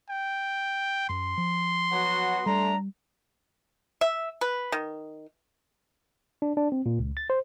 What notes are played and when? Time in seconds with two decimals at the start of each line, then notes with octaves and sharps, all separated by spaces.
0.10 G5
1.09 F#2 C6
1.38 F3
1.92 F#3 B3 F#4
2.46 G3 A3 D4 A#5
4.01 E5
4.41 B4
4.72 D#3
6.42 D4
6.57 D4
6.72 C4
6.86 A#2
6.99 C#2
7.17 A6
7.30 C5